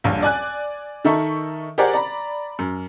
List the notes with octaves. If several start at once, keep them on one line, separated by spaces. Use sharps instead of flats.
D#1 A#1 G2
D5 G#5 F#6
D#3 D#4 A4 A#4 E5 C#6
G4 G#4 A#4 C5 D5 F#5
D5 A#5 B5
F#2